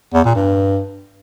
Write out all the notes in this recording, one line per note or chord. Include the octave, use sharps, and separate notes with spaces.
E2
A#2
G2